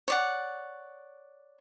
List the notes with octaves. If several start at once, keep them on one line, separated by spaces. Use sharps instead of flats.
C#5 D5 F#5